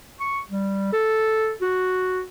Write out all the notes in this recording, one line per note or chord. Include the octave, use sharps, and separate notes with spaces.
C#6
G3
A4
F#4